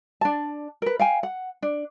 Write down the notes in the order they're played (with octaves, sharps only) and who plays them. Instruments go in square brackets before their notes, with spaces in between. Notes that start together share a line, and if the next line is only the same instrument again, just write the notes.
[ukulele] D4 A5
A#4 B4
F5 G5 G#5
F#5
D4